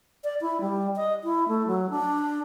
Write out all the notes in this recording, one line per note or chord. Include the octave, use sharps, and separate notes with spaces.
D5
E4
G3
D#5
E4
A3
F#3
D4